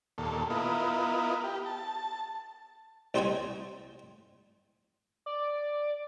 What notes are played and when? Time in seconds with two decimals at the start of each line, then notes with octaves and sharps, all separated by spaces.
0.18 D#2 A#2 A4
0.50 B3 E4 F4 A#4 D#5
1.44 G4
1.66 A5
3.14 C2 G3 C5 D#5 G5 G#5
5.26 D5